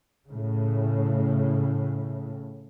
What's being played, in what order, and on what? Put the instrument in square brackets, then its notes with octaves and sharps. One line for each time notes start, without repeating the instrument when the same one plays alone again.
[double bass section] A2 C#3